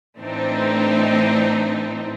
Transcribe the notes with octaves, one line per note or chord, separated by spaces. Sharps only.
A2 E3 C4 D4 D#4